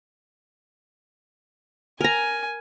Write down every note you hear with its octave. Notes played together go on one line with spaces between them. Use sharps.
A#4 G#5 A#5